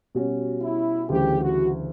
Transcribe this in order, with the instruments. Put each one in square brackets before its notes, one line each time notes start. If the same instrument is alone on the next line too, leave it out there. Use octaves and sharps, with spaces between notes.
[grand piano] B2 G3 C#4 F#4
[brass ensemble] E4
[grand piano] D2 C#3 E3 G3 [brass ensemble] G4
[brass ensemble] F#4